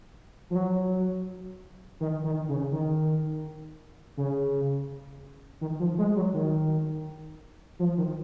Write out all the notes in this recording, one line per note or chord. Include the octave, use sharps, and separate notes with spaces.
F3
F#3
D#3
D#3
C#3
D#3
C#3
D#3
F3
G#3
F#3
D#3
F3
D#3